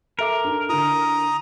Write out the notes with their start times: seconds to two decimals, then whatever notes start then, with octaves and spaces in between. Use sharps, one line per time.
0.19 A4 A#4 E5 D6
0.44 D4 D#4 A4
0.69 D3 E4 A#5 D#6